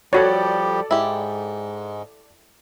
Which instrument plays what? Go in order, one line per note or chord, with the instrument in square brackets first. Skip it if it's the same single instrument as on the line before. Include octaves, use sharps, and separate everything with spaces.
[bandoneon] F3 G3 G4 [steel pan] F#4 C#5 [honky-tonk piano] A4 D5
[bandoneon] G#2 G#3 [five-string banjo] E4 G4